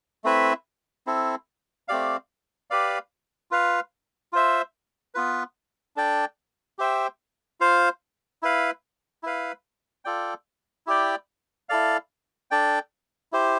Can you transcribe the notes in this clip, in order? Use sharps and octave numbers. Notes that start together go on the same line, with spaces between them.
A3 C4 E4 B4 E5
C4 E4 A4
A3 C4 G4 D5 F5
G4 B4 D5 F5
F4 B4 F5
F4 C5 E5
B3 F4 B4
D4 A4 D5 G5
G4 C5 E5 G5
F4 C5 F5
E4 B4 F5
E4 B4 F5
F4 A4 D5 G5
E4 G4 D5 G5
E4 A4 D5 F5
D4 A4 D5 G5
E4 G4 C5